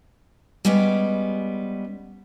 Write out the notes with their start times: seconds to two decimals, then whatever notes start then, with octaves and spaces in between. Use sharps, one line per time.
0.65 G3 G#3 B3 C#4 G4